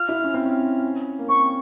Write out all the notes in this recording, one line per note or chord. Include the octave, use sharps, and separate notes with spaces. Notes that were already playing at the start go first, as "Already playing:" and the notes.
Already playing: F4 F6
E4
C#4
C4
C#4
A#3
C4 C#6